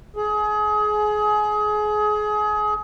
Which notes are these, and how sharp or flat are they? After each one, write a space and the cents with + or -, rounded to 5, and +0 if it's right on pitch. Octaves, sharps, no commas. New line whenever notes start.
G#4 +25